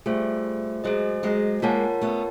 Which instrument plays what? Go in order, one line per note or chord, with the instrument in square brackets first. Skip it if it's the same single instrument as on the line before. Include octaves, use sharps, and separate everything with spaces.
[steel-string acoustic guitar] G3 A3 [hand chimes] F4 G#4 C5 E5
[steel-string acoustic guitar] F#3 G#3 [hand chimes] G#4 C5 D#5
[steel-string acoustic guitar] F#3 G#3
[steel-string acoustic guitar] G#3 A#3 [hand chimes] F4 A#4 C#5 F#5 A5
[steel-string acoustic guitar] A3 B3